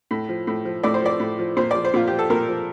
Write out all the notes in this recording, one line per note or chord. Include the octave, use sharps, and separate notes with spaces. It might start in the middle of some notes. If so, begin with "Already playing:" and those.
A2
F3
A2
F3
A2 D5
C5
F3 D5
A2
F3
A#2 C5
F3 D5
C5
A#2 F4
F3 G4
A4
A#2 A#4
F3